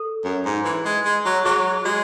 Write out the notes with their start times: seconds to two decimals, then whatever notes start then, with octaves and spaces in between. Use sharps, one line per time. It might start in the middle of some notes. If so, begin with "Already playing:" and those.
Already playing: A4
0.24 F#2
0.45 G#2
0.65 E3
0.85 G#3
1.05 G#3
1.25 F#3
1.45 F#3 G#4
1.85 G#3 F#4